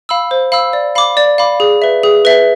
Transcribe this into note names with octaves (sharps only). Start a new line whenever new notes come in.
F5 B5 E6
C5
F5 B5 E6
D5
F5 B5 D6
D5
F5 B5 D6
G#4
B4 E5
G#4
B4 E5